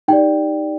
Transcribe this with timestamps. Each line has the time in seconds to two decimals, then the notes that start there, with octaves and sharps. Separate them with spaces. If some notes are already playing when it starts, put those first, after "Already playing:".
0.08 D#4 G4 D5 G5